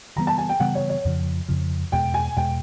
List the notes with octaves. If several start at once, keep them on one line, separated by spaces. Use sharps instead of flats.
C#3 E3 G3 B3 A#5
A5
G#5
G5
C#3 E3 G3 B3 F#5
C#5
C#5
F2 C#3 F3
F2 C#3 F3
E2 B2 G#3 G5
G#5
E2 B2 G#3 G5